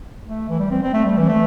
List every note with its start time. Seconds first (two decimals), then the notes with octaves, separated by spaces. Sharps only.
0.25 A3
0.49 E3
0.59 G3
0.71 C4
0.82 C4
0.94 A3
1.05 G3
1.17 E3
1.28 A3